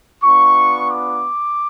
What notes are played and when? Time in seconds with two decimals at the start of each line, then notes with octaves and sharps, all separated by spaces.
0.23 B3 D4 F4 C#6
0.89 D6